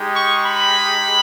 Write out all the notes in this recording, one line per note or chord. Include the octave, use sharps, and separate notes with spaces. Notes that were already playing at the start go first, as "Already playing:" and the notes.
Already playing: G#3 D#4 G4
C#6
B5